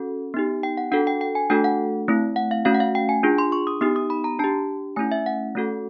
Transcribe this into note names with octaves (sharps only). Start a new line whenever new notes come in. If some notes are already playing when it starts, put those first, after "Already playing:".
Already playing: C#4 F#4 A4
B3 D#4 G4
G5
F#5
D4 F#4 A4 F#5
G5
G5
G#5
A3 D4 F#4 A4 G5
F#5
A3 C4 E4
F#5
F5
A3 C#4 F#4 F5
F#5
F5
G5
G#5
D4 F4 G#4
C6
C#6
D#6
B3 D#4 G4 D#6
D#6
B5
A#5
D4 G4 A5
A3 C#4 E4 G#5
E5
F#5
A3 C#4 F#4 A4